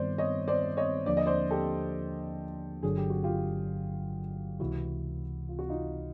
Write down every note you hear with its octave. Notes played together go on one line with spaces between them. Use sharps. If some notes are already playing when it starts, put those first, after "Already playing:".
Already playing: G2 D#3 G3 B3 C5 D5
C#5 D#5
C5 D5
C#5 D#5
D#2 D3 F3 A#3 D4 D5
D#5
C5 D5
G4 A4
G1 G2 D3 F#3 G#4
G4
F#4
F4 G4
C#2 C3 E3 E4 F#4
F4
F#4
D#4 F4